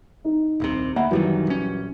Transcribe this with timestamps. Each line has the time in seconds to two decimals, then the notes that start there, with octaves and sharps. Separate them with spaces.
0.25 D#4
0.60 D#1 C2 C3
0.96 D2 A#3 E5 F#5 B5
1.11 F#1 F#2 D#3 E3 F#3 G3
1.47 A#1 C#4